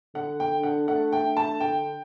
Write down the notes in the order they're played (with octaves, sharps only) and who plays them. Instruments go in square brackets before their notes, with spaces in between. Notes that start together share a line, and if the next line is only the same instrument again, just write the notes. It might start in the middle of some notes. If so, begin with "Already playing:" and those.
[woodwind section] D3 [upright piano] F#5
[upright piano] G5
[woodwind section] D4
[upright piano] F#5
[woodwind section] A3 [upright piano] F#5
[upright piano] G5
[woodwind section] D4
[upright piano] A5
[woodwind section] D3 [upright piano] G5